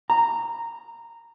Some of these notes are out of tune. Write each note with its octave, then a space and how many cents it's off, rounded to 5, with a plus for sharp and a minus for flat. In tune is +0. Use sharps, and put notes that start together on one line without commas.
A#5 -10